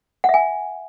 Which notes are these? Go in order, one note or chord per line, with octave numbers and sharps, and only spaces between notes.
E5 F#5 G#5